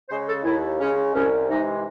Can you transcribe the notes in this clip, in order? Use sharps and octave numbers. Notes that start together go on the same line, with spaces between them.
C#3 G#3 C5
A4
D#2 E4
C#3 G#3 C#4
C2 C#4
C3 E3 G#3 D#4